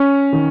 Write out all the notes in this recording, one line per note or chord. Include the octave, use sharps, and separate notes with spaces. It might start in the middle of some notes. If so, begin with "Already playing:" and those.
Already playing: C#4
D#3